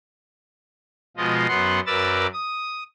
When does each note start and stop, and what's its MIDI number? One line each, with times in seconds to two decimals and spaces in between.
1.17 1.47 47
1.17 1.47 53
1.17 1.47 56
1.17 1.47 65
1.17 1.47 75
1.48 1.80 42
1.48 1.80 59
1.48 1.80 78
1.48 1.80 84
1.86 2.27 42
1.86 2.27 70
1.86 2.27 71
1.86 2.27 74
1.86 2.27 88
1.86 2.27 93
2.33 2.83 87